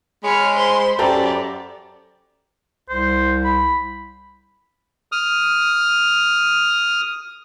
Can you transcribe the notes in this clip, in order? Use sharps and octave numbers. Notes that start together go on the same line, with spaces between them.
G#3 C#5 B5 F6
C5 B5 C6
F#2 G4 A4 D5 A#5
C2 C5
B5
D#6 F6